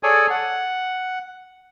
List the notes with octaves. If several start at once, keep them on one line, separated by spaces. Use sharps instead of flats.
G#4 A4 C#5 D5 G#5
F#5